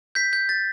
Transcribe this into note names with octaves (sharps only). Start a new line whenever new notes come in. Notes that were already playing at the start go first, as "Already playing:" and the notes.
G6 B6
G6
G6 A6